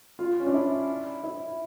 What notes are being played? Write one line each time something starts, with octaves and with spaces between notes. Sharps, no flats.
F4
C#4
D4
E4
E4